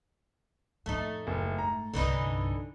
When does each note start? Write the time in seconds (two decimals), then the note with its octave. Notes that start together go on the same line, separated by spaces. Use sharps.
0.86 F2 A2 A3 D#4
1.27 F#1
1.58 G#2 A#5
1.94 C2 G2 D3 E3 D#4